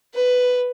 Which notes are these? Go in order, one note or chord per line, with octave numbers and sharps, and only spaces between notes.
B4